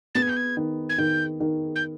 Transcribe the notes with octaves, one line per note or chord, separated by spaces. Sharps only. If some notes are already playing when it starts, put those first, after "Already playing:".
B3 A6
G#6
G6
G#6
D#3
G#6
D#3 G6
D#3
G6